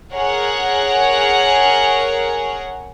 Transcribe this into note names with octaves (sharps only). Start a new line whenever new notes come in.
G#4 A#4 C#5 F#5